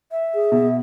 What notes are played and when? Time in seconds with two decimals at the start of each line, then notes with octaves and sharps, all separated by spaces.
0.11 E5
0.34 G#4
0.52 B2